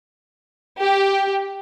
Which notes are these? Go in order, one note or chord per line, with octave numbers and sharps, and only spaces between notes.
G4